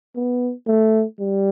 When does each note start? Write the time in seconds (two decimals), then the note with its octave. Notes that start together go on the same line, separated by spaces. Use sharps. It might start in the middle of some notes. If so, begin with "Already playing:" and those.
0.16 B3
0.67 A3
1.20 G3